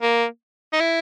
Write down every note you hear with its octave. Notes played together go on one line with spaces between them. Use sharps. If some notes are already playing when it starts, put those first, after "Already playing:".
A#3
D#4
E4